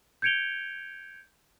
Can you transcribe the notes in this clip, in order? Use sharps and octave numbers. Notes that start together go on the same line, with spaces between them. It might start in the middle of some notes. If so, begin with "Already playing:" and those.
G6 G#6 C#7 D7 F7 G7